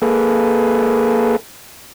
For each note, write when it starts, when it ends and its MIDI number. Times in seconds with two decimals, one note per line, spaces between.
0.02 1.36 58
0.02 1.36 68
0.02 1.36 69
0.02 1.36 71